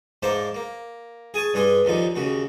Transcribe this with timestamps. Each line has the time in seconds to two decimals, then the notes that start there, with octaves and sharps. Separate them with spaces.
0.23 G#2 A#3 C5 D5 A5
0.54 A#3
1.34 G#4 G#5 A5 C#6
1.54 G2 D4 G#4 C6
1.85 D#2 D3 F3 D#4
2.15 D#2 C#3 F#4